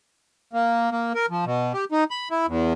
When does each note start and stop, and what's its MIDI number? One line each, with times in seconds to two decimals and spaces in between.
0.53 0.91 58
0.91 1.13 58
1.15 1.26 70
1.30 1.45 53
1.45 1.73 47
1.73 1.85 67
1.92 2.04 63
2.11 2.29 83
2.31 2.46 64
2.47 2.73 40